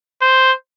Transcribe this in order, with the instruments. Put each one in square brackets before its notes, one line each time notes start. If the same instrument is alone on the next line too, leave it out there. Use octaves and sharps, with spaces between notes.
[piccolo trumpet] C5